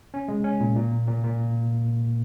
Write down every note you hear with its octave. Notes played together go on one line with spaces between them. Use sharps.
C#4
G#3
C#4
A#2
A#2
A#3
A#2
A#2